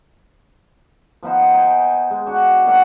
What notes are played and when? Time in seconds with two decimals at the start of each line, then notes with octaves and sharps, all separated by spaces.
1.23 F3 B3 D#4 C5
1.54 D#4 G#5
2.11 G#3
2.26 D4 F#4
2.66 F#3 A#3 D#4 F#4